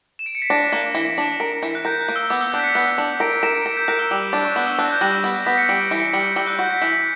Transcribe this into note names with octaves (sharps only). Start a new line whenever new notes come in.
E7
D7
C#7
B6
D4 A#6
A#3
E3
D4
A#4
E3
F#6
A#4 G6
F#6
A#3
E6
B3 D6
E6
D4 G6
B6
C#7
B3
D4
A#4 D7
D7
A#4 E7
D7
A#4 B6
G6
A#4 F#6
E6
G3 D6
D4
C#6
B3 D6
E6
D4 F#6
A#6
G6
G3 A#6
B3
B3 B6
C#7
G3 D7
D7
E3 D7
C#7
B6
G3 C#7
G3 E6
F#6
F#4 G6
B6
E3 B6